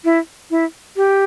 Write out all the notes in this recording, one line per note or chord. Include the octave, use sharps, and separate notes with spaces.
E4
E4
G4